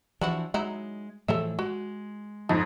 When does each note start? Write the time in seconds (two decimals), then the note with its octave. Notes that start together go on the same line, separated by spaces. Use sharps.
0.21 E3 F3 D4 E4 F#4
0.54 F#3 G#3 D#4 E4
1.28 A2 E3 F3 A4 C#5 E5
1.59 G#3 F#4
2.49 F2 G#2 F3 D#4